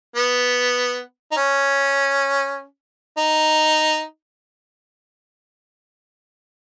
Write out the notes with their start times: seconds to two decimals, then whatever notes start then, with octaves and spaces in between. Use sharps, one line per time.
0.16 B3
1.32 D#4
1.37 C#4
3.18 D#4